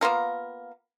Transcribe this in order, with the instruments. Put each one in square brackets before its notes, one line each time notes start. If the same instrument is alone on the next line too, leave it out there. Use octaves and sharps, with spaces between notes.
[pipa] A#3 B3 F4 A#4